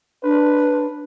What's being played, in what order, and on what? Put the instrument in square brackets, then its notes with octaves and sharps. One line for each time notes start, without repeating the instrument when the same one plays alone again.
[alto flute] D4 [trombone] B4